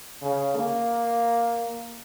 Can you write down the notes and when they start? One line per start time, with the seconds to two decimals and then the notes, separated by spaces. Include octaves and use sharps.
0.22 C#3
0.56 A#3